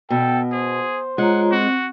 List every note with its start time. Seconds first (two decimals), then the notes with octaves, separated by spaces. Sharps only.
0.10 B2 A4 G5
0.52 G#4 C5
1.18 G#3 F4 C#5 F#5 A#5
1.51 C4 F#4